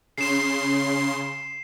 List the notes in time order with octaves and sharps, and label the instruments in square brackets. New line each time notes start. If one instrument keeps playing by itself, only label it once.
[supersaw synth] C#3 C6 [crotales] C7 E7